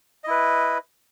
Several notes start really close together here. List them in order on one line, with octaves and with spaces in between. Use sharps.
D#5 E4 B4